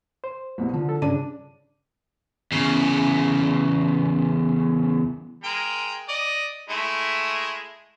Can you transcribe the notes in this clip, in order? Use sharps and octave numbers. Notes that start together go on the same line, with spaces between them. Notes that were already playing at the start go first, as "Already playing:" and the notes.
C5
C2 B2 G3
D3 F3
A4
G2 C#3 D4 D#7
E2 C#3
G#3 A#4 G5
D5 D#5
G#3 A3 E4